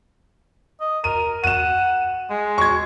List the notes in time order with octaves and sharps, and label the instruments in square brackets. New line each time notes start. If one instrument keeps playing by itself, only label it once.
[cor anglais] D#5
[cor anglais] A#4 [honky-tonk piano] D#7
[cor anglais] F#5 [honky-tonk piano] D#7 E7
[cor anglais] G#3
[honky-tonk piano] C#6 G#6